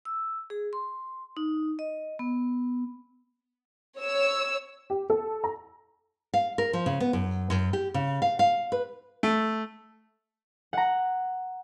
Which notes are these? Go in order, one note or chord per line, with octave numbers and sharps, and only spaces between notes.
E6
G#4
C6
D#4
D#5
B3
C#5 E6
G4
A4
A#5
F5
A#4
F3
C#3
B3
F#2
F#2
G4
C#3
F5
F5
B4
A3
F#5 A#5